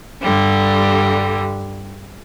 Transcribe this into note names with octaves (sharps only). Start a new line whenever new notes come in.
G2 D3 G3